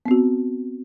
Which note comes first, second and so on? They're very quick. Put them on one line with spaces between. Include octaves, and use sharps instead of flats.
B3 C4 F#4